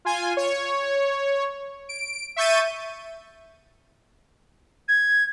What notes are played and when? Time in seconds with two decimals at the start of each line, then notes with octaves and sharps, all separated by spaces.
0.05 F4 G#5
0.37 C#5
1.89 D7
2.36 E5 C#6 G6 A6 D#7
4.89 G#6